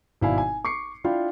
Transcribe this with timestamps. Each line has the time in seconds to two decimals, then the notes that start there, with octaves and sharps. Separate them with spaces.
0.21 G#1 B2 E4 D5 F5 G#5
0.38 G#5
0.65 C#6 D6 C7 C#7
1.04 D4 E4 F4 F5 G5 B5